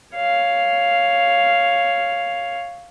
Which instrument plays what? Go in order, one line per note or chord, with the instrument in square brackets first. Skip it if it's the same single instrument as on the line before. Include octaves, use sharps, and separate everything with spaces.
[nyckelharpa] C#5 F5